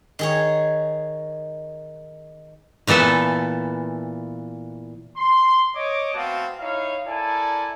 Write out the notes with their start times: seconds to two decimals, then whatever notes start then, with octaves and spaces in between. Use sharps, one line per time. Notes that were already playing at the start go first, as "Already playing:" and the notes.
0.19 D#3 G#4 C#5
2.87 A#2 E3 B3 A4 E5
5.17 C6
5.75 C#5 D#5 D6
6.14 A3 B3 C4 F#4 F5 A5
6.59 D#4 E4 C#5 F5
7.07 E4 A4 A#4 D5 G#5 A5